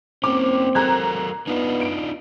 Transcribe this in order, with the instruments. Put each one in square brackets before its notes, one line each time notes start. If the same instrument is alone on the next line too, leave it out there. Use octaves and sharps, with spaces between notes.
[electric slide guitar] A#3 C#4 [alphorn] C4 [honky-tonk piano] D6
[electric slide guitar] F#3 A4 A#4 [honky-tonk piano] A#5 F#6 G#6
[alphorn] B3 [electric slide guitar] D4 D#4 F4
[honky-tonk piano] D7